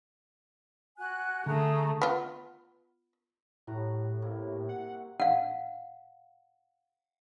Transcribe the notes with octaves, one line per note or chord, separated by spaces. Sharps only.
F#4 G#5 F#6
D3 A3 G#4 A#5
B3 F4
A2 G3 F#4 A#5
C3 A#3 E4
F#5
F5 F#5